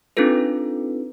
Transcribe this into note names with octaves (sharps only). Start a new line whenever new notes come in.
C4 D4 D#4 F4 A4 B4